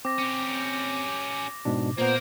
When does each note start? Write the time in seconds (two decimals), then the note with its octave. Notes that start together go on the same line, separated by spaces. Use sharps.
0.05 C4 D6 A#6
0.19 C#4 G4
1.65 G#2 B2 D4
1.98 A#2 A#3 B3 A#4 C5